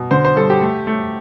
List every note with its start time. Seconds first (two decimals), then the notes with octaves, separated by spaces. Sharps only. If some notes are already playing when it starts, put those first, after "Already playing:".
Already playing: B2
0.11 D3 C5
0.25 C5
0.36 G2 A4
0.50 G4
0.61 A3
0.87 A3